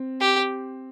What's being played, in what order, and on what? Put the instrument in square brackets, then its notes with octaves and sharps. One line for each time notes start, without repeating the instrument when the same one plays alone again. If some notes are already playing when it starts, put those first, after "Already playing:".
Already playing: [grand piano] C4
[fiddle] G4